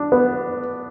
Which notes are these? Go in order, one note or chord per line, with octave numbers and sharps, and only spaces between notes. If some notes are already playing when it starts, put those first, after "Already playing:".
Already playing: D4
B3